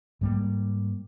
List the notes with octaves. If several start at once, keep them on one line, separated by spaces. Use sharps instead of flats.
G#2 G3 A#3